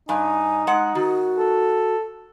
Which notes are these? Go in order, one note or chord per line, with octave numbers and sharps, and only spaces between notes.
G2 D#4 G#5
G#3 F#5
D#3 F#4
A4